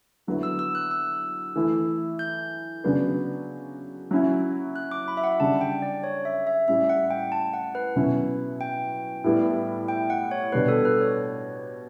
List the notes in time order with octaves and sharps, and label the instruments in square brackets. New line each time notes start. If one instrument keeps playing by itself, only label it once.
[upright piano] D3 F#3 B3 E4
[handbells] E6
E6
F#6
E6
[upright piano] E3 A3 E4
[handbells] G6
[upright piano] C#3 F#3 B3 D4
F#3 C#4 E4
[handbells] F#6
D6
B5
E5
F#5
[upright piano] C#3 G3 D4 [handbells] A5
[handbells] G5
D5
C#5
E5
E5
[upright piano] A2 G3 C#4 E4 [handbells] E5
[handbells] F#5
G5
A5
F#5
B4
[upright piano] B2 F#3 C#4 E4
[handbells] G5
[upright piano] A2 G3 B3 E4
[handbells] G5
F#5
C#5
[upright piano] B2 G3 D4 [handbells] B4
[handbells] A4
B4
C#5